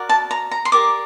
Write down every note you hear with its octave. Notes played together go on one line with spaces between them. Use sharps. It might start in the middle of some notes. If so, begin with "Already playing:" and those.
Already playing: F#4 A#4 D5
A5
A#5
A#5
C6
G4 A#4 D5 D6